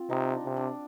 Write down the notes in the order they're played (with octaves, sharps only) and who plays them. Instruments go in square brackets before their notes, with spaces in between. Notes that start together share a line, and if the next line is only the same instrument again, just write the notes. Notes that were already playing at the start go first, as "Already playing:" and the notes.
Already playing: [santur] C4 F4
[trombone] C3 [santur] D#4
[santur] D4
[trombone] C3
[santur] D4